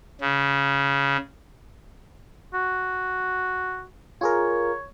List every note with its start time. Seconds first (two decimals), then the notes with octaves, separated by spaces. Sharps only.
0.21 C#3
2.54 F#4
4.21 F4 G#4 A#4 C#5